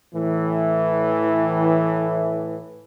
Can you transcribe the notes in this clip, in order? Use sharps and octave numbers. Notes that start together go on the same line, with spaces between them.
A2 E3